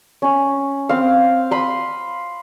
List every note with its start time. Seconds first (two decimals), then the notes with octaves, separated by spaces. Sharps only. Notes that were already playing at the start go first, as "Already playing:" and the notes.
0.22 C#4 B5
0.89 C4 F5
1.51 B5 C6 D#6